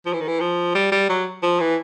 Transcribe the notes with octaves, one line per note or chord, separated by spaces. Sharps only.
F3
E3
D#3
E3
F3
G3
G3
F#3
F3
E3